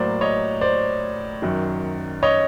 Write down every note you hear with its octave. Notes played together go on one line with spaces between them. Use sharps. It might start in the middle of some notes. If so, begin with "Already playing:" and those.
Already playing: A2 F#3 A#3 C5 D5
C#5 D#5
C5 D5
F#2 D#3 F#3
C#5 D#5